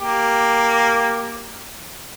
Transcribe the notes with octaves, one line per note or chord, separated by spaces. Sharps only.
A#3 G4